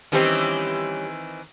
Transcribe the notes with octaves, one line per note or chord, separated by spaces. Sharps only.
D#3 E3 G3 C4 C#4 D#5